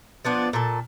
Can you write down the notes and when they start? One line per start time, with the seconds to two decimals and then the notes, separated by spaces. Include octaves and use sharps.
0.25 F3 B3 D4 F4
0.53 A#2 A4